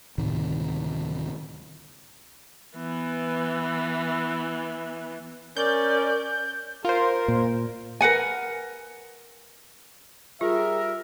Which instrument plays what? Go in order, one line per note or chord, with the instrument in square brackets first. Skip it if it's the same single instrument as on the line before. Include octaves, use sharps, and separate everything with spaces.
[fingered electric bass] D2 A2 C3 D#3
[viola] E3 B3
[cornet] C#4 [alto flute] A#4 [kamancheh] D5 [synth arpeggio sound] G6
[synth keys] F4 C5 [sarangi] A#4
[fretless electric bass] A#2
[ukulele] A#4 B4 F#5 G#5
[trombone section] G3 A#4 [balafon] F4 [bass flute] G#4 [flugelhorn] E5